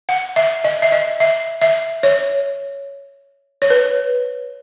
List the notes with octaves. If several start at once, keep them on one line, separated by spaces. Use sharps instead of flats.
F#5
E5
D#5
E5
D#5
E5
E5
C#5
C#5
B4